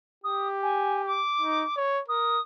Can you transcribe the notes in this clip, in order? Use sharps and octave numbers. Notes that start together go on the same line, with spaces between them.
G4 D#6
G#5
D6
D#4
C#5
A#4 D#6